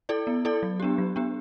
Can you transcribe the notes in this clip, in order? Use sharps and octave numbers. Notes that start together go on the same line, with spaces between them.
E4 A4 D5
B3
E4 A4 D5
F#3
B3 D4 G4
F#3
B3 D4 G4